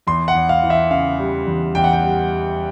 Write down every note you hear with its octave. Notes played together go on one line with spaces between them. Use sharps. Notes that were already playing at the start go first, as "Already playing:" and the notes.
E2 C6
F#5
E2
F5
E3
E5
C#3 F5
G3
E2
E2 G5
F#5
G5
G3